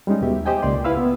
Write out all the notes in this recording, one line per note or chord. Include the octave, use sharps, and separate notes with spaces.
G3 G#3 C#4 D#4
D#2 B2 G4 E5
G4 C5 D#5 G5 G#5
C#2 A#3 D5 C6
E4 B4 F5 B5 E6
B3